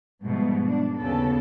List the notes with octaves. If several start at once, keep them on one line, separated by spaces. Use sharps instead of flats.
G#2 B2 F3 G3 A3
D4
D#2 C#3 B3 A4